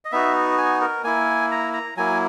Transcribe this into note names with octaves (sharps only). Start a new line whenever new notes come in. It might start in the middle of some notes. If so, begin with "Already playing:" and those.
D#5
B3 D#4 F#4 E5
G#5
A#4
A#3 E4 G#5
A#5
A#5
F#3 A#3 E4 G#5